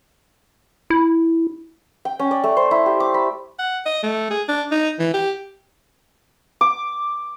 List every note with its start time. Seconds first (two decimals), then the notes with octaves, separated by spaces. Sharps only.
0.90 E4
2.05 G5
2.19 C#4
2.31 D5
2.44 A3
2.57 C5
2.71 E4
2.86 G4
3.00 D6
3.14 B5
3.59 F#5
3.86 D#5
4.03 A3
4.31 G#4
4.49 D4
4.71 D#4
4.99 E3
5.14 G4
6.61 D6